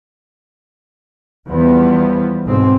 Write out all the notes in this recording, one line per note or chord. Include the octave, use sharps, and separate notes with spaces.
E2 E3 F3 G3 B3
B1 G#2 C4